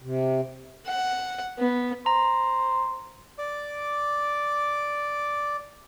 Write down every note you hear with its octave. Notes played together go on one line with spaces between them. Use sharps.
C3
F#5
B3
C5 A#5
D5 D6